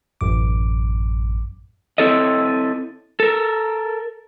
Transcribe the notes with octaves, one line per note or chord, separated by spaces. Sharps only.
A1 F#2 D6
C4 E4 A4 C#5 D#5
A4 A#4